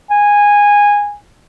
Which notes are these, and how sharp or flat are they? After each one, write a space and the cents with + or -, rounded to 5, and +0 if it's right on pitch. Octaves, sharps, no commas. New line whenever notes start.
G#5 -15